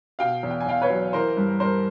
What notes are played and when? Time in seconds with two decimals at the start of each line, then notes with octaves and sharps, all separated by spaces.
0.19 B2 F5 G5
0.43 E2
0.51 G5
0.61 G#5
0.66 E2 F5 G5
0.82 B4 C#5
0.90 F#3
1.13 E3 A#4 C5
1.37 G2
1.60 G2 A#4 C5